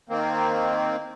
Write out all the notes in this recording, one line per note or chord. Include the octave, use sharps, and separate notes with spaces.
D#3 A#3 C4